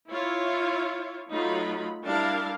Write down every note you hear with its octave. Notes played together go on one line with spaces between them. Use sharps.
E4 F4 C#5
F#3 A3 D#4 F4 B5
G3 D4 E4 A#4 F5 A5